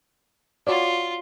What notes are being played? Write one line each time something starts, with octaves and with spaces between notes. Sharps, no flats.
F4 F#4 C#5 D5